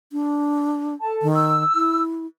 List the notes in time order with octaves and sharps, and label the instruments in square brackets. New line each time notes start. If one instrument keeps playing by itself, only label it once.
[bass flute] D4
[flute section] A4 A5
[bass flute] D#3
[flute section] E6
[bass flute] E4